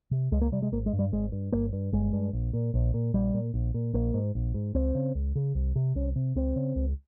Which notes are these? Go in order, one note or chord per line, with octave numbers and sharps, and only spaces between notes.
C3
C#2 G#3
A#3
C3 G3
G#3
G#1 A#3
G#3
G2
G3
G#1 G#3
G2
G1 A#3
G2
G1 G#3
G2
A#1
A#2
A#1
A#2
A#1 G3
A#2
A#1
A#2
A#1 A#3
G#2
A#1
G#2
C#2 C4
C#3
C#2
C#3
C2
C3
C2 C#4
C3
C#2 C4
C#3
C#2